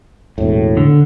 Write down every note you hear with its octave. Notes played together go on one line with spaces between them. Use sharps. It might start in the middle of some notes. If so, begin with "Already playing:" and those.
E1 A2
D3